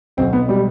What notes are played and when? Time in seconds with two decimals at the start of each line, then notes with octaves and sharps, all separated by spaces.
0.17 B1 B2 F#3 C4
0.33 B3
0.49 G3